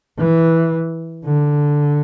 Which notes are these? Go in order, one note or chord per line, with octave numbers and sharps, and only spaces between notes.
E3
D3